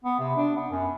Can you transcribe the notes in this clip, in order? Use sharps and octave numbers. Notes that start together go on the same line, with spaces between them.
B3
C3
D4
B3
F#2